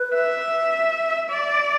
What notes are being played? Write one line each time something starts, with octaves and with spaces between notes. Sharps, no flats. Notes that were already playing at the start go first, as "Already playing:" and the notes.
Already playing: B4
E5
D5